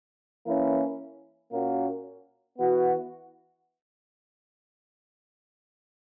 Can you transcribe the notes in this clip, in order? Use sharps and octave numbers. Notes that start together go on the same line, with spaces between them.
E3 A#3 C#4 E4
A#2 A#3 C#4 F#4
E3 B3 F#4